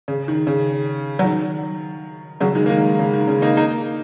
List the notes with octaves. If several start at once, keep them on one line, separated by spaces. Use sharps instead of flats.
C#3
D#3
C#3
F#3
D#3
C#3 F#3
D#3 G#3
A#3
D#3 G#3
C#3
D#3
C#3
A#3 D#4
A#3 D#4